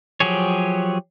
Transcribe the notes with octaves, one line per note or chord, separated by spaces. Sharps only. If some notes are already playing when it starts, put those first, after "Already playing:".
F3 F#3 G4 G#4 C#5